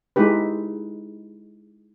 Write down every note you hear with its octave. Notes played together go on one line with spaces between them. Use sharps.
G#3 D#4 E4 G4 B4